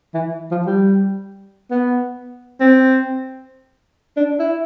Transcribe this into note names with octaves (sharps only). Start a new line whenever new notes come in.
E3
F3
G3
B3
C4
D4
E4